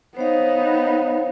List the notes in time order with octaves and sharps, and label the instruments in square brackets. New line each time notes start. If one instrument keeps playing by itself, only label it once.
[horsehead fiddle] B3 D#4 [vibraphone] C5 C#5 F5